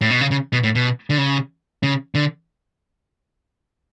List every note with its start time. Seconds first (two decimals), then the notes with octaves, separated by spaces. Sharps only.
0.01 A2
0.10 B2
0.21 C#3
0.31 C#3
0.53 B2
0.63 A2
0.75 B2
1.10 D3
1.18 C#3
1.83 C#3
2.15 D3